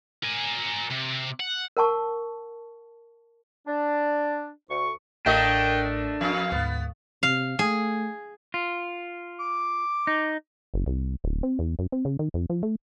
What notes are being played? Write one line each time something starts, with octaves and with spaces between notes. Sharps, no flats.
A#4 G#5
C3
F#5
A#4 F#5 A5 C#6
D4
D2 C#6
A1 A2 A3 D4 A#4 D#5 G5
F2 F5
D2 G#2 B3
C3 F5
A3 G#4
F4
D6
D#4
F#1
C2
D1
C4
E2
F#2
C4
C#3
D#3
F2
F3
A3